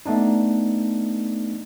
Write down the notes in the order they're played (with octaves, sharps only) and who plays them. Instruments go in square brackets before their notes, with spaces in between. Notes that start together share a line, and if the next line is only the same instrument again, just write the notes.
[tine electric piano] A3 B3 D4 D#4